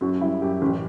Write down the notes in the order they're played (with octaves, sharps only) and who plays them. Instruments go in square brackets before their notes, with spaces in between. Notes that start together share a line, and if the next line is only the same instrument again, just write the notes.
[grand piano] F#2 F#4
G3 E4
F#2 G4
A1